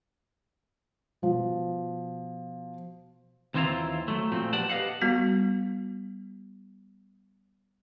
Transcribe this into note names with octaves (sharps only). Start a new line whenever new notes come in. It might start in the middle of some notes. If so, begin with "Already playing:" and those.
B2 F3
D#2 E3 C4 E4 F4 A#5
F#3 A3
A#2 F3 A3 C4
G4 B4 D5 F#5 G5 A5
G4 B4 D#5 F5 F#5
G3 B3 F#4